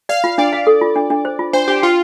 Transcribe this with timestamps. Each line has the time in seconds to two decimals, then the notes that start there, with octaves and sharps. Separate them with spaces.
0.09 D5 F5
0.24 F4
0.38 D4 D5
0.53 F5
0.67 A4
0.81 F4
0.96 D4
1.10 D4
1.25 C5
1.39 F4
1.53 D4 C5
1.68 D4 G4
1.83 F4 G5